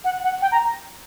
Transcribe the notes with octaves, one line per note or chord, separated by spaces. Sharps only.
F#5
F#5
G5
A#5